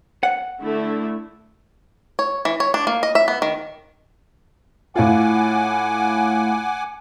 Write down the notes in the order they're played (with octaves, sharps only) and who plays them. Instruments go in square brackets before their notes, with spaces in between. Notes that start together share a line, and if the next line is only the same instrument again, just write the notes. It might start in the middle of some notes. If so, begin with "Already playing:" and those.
[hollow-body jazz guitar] F#5
[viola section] D3 A3 E4
[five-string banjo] C#5
E3
C#5
D4
A#3
D#5
E5
B3
D#3
[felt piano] A2 F4 [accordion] F#5 G#5 D6